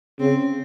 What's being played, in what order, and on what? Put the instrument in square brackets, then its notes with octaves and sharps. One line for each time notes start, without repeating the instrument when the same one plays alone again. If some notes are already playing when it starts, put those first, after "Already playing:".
[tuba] C#3 [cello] C4